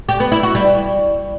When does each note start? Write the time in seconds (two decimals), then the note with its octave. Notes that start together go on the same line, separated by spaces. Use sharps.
0.09 G4
0.20 B3
0.32 E4
0.43 F#4
0.55 G3